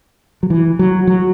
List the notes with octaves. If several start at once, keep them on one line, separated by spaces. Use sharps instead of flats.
F#3
E3
F#3
F#3